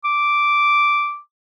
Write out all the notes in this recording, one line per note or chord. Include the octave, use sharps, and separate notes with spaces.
D6